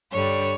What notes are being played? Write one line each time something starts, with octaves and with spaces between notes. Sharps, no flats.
G2 D3 G3 C#5